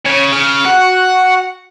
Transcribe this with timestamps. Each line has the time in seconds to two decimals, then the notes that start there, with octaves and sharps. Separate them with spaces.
0.06 C#3 C#5
0.33 C#3 F6
0.65 F#4 F#5